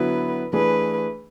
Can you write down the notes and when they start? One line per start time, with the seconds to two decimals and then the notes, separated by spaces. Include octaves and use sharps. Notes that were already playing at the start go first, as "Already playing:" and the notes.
Already playing: D3 F#3 B3 E4 B4
0.53 E3 A3 D4 G#4 B4